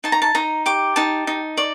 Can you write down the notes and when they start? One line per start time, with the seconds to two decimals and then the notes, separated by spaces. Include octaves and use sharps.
0.04 D#4 A5
0.12 A#5
0.22 A5
0.35 D#4 A#5
0.66 G4 D6
0.96 D#4 A5
1.27 D#4
1.57 D5